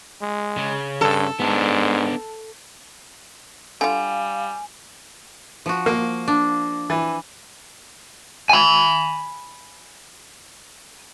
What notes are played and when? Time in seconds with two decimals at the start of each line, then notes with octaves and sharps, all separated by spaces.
0.21 G#3
0.58 C#3
1.01 G2 A4
1.40 G#2 B3 D4
3.81 D3 G3 F4 F5 G#5
5.66 F3 F#4
5.86 A#3
6.28 D4
6.90 E3
8.50 G#5 B5